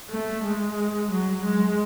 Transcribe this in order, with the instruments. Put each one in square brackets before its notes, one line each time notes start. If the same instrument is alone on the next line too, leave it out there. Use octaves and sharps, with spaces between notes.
[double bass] A3
G#3
F#3
G#3